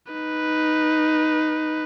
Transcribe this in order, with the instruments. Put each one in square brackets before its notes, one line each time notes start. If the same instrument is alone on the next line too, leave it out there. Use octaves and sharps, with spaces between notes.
[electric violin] D#4 B4